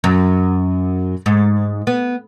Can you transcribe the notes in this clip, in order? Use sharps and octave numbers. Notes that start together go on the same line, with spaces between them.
F#2
G#2
B3